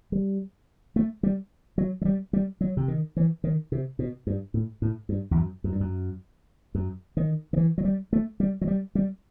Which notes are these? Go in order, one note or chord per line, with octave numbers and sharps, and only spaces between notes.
G3
A3
G3
F#3
F#3
G3
G3
F#3
C3
D#3
E3
D#3
C3
B2
G2
A2
A2
G2
E2
F#2
F#2
G2
F#2
F#2
D#3
D#3
E3
F#3
G3
A3
G3
F#3
G3
G3